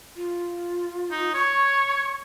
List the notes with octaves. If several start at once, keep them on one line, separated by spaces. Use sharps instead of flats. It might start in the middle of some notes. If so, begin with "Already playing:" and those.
F4
D#4
C#5 C#6